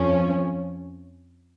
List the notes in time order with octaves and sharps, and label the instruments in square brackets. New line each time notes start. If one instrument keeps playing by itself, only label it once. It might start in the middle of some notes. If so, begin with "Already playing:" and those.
Already playing: [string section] F2 F3 C#4